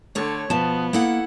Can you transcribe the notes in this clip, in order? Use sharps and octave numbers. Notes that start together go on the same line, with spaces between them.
D3 A3 C#5
B2 F3 B3 A5
A#3 E4 A4 F#5